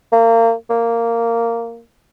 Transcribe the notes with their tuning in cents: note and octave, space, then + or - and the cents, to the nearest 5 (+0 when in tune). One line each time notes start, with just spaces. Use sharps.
A#3 -30
A#3 -10